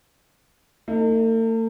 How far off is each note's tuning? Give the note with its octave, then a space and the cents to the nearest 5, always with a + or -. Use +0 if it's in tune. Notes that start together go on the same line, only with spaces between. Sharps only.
A3 +45 D#4 +5